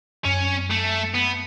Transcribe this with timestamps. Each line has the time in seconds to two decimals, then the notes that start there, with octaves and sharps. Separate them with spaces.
0.25 F#2 C#4
0.70 A3
1.15 B3